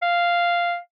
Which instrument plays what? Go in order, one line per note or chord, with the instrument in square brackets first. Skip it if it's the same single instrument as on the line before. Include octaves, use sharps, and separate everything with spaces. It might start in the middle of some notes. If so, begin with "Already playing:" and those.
[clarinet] F5